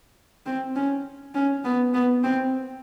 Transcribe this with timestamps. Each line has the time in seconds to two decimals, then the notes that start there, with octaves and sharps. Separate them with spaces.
0.46 C4
0.76 C#4
1.35 C#4
1.64 B3
1.94 B3
2.24 C4